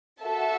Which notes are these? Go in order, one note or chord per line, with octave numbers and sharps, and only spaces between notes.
F#4 A4 E5 A5